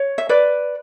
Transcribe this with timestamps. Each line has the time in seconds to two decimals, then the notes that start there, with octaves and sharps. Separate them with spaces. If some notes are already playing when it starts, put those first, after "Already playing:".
Already playing: C#5
0.18 E5
0.29 B4 D5